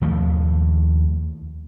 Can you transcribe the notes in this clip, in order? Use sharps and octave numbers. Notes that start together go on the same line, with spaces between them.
D#2 F3 G3 A3